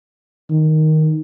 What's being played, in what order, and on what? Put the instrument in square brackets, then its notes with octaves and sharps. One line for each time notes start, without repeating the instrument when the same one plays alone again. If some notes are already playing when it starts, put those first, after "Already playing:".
[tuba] D#3